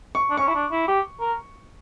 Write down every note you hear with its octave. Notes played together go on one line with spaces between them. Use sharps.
C#6
D4
C#4 C#6
E4
D4
E4
G4
A#4